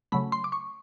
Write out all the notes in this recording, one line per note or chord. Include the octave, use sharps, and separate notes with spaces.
C#3 F#3 A3 B5
C6
D6
C#6